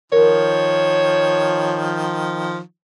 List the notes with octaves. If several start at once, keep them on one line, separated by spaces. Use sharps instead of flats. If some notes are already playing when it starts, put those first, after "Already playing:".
D#3 F3 A#4 C#5